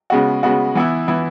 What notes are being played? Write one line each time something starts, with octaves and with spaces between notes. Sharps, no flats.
C#3 G#3 B3 F#4
C#3 G#3 B3 F#4
E3 B3 E4
E3 B3 E4